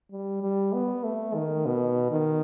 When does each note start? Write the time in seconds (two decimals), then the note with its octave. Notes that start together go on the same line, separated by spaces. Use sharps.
0.12 G3
0.43 G3
0.73 B3
1.04 A3
1.35 D#3
1.66 B2
2.12 D#3